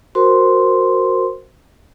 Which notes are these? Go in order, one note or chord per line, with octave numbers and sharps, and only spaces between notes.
F#4 A#4 C5 C6